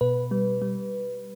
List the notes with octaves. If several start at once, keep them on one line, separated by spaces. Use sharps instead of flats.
B2 B4
G3
G3